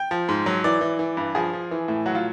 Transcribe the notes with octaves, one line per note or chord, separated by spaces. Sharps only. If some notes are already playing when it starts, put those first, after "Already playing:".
Already playing: G5
F3
G#2
F#3
E3 D5
E3
E3
G2
F3 G#4
F3
E3
A2
F#3 F#4
F4